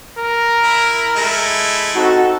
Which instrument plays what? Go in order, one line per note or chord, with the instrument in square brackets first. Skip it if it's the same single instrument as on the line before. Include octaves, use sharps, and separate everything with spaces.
[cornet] A#4
[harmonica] E4
G#3 A3 E4
[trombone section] C4 D#4 F#4 [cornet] A4